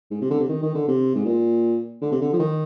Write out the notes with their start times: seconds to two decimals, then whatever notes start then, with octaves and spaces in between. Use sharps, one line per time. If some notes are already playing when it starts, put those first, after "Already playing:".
0.11 G#2
0.22 C3
0.31 D3
0.40 C3
0.49 D#3
0.62 D#3
0.75 D3
0.88 C3
1.15 G#2
1.25 A#2
2.02 D3
2.12 C3
2.21 D3
2.33 F3
2.39 D#3